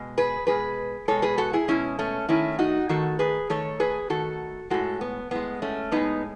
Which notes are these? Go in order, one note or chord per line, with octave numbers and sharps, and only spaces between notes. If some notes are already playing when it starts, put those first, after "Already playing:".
Already playing: B2 G#3
G#4 B4
B2 G#3 G#4 B4
B2 G#3 A4 C#5
G#4 B4
F#4 A4
E4 G#4
B2 G#3 C#4 E4
A3 C#4
D#3 A3 C#4 E4
D#4 F#4
D#3 A3 F#4 A4
G#4 B4
D#3 A3 A4 C#5
G#4 B4
D#3 A3 F#4 A4
A2 G#3 F#4 A4
B3
A2 G#3 B3
A3 C#4
A2 G#3 B3 D#4